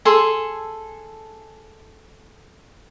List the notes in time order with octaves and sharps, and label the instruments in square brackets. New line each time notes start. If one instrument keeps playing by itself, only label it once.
[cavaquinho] G#4 A4 C6